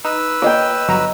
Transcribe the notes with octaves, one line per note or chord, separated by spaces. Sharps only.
D#4 B4 E6
A#3 C#5 D#5 G5
G1 F#3 A#5